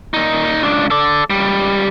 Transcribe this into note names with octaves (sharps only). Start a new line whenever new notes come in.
A#2 D#4
C#2 D4
A4 D5
C#2 G3